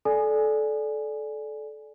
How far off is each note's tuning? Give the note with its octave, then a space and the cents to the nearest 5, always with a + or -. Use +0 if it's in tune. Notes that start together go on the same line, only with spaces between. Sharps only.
A4 -25 D5 +0 G#5 +0